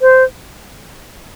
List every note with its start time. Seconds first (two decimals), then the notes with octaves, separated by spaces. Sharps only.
0.01 C5